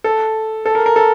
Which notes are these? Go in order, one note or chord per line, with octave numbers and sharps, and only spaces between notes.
A4
A4
A#4
A#4
A4